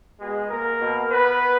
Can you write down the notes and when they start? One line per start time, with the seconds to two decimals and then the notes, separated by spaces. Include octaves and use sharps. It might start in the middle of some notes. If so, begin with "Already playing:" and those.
0.19 B2 G#3 G#4
0.49 A#3 A#4
0.79 B2
1.10 B3 B4